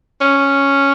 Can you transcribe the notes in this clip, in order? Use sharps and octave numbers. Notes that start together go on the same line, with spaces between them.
C#4